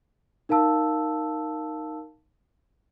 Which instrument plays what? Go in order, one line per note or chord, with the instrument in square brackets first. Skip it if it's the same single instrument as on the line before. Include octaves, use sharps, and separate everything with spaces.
[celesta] D#4 A#4 F5 A5 E6